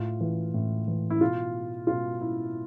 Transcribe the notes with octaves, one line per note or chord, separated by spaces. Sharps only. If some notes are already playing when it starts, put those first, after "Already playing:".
Already playing: A2 F4
E3
A2
E3
E4
B2 F4
B2 F4
E4